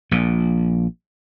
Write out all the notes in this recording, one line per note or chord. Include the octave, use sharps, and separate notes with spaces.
A#1 A#2